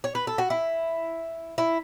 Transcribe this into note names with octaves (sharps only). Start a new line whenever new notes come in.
C#5
B4
A4
F#4
E4
E4